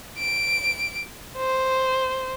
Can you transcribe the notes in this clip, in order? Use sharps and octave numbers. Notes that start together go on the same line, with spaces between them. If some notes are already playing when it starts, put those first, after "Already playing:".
D7
C5